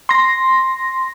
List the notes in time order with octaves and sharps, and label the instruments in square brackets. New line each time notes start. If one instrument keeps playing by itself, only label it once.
[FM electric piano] C6 A#6